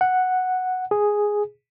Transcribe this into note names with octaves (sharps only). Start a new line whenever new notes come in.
F#5
G#4